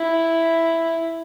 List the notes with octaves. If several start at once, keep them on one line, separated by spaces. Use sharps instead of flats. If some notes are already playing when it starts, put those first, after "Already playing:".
Already playing: E4